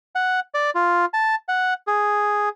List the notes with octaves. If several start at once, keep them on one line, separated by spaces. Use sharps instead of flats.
F#5
D5
F4
A5
F#5
G#4